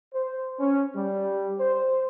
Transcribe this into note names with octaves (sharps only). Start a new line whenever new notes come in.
C5
C#4
G3
C5